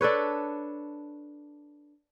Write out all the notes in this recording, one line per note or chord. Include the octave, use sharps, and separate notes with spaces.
D4 A4 B4 C#5